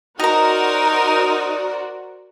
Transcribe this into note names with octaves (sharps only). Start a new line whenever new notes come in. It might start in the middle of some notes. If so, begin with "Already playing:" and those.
D#4 F#4 A#4 C5 D5 D#5 A#5